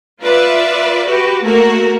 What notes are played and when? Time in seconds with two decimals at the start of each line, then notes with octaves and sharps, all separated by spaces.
0.20 F4 B4 D5 E5
1.06 F#4 G4 B4
1.42 A3 A#3 F#4 A#4